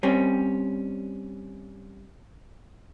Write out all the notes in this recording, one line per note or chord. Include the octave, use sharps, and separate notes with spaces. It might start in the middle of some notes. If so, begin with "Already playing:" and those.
G3 C4 C#4